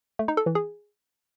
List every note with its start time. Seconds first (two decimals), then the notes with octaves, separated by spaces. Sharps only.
0.19 A3
0.28 D#4
0.37 A4
0.46 E3
0.55 G#4